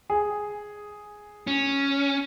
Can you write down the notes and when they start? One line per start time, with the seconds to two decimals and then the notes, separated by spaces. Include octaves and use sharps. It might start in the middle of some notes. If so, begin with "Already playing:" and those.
0.10 G#4
1.47 C#4